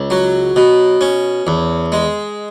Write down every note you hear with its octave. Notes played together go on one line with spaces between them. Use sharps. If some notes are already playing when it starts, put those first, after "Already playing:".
Already playing: C#2
F#3
B2
C#4
E2
G#3